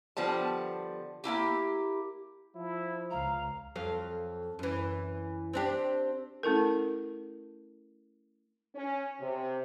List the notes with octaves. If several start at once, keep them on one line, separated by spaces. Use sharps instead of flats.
D3 F3 G3 B3 A5
A#3 D#4 E4 G4
F3 E4
C#2 F5 A#5
F2 F#3 F5
F#2 E3
C4 D4 G4
A3 C#4 E4 A4 A#4
C#4
C3